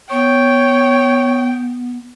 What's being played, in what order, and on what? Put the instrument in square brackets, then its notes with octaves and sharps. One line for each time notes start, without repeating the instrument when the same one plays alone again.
[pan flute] B3 [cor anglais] C#5 [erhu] G5